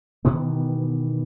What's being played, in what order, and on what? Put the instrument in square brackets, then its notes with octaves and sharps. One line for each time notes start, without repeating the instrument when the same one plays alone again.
[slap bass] B2 D#3 E3 B3